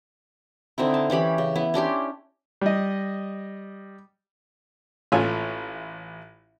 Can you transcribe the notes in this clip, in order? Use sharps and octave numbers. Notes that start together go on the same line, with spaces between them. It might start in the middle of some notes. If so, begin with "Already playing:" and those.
D3 C4 D#4 E4
A5
E3 C#4 G4 B5
C#3
B3 E4
C#4 D4 G4 C6
G3 D#5
A1 A3 F4 C#5 G#5 E6